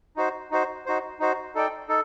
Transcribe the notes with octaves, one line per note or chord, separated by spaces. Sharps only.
D#4 F#4 C5
D#4 F#4 C5
D#4 F#4 C5
D#4 F#4 C5
D#4 A4 D5 G5
D#4 A4